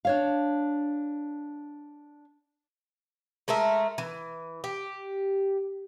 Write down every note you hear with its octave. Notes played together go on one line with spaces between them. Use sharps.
D4 C#5 F5
G#3 A3 A#4 E5
E3
G4